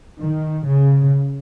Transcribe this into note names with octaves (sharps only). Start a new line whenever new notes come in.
D#3
C#3